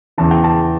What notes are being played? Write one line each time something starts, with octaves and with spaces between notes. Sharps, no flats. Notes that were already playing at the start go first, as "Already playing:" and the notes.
E2 C#3 E3 A5
G5
A5